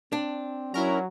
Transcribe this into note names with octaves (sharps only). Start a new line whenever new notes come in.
C4 D4
F#3 C#4 E4 A#4 A#5